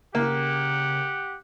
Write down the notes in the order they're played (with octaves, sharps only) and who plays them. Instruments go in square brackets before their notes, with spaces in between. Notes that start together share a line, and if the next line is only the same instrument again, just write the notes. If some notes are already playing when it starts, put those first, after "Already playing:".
[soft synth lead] C#3 [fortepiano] A#3 [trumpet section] G4 F#5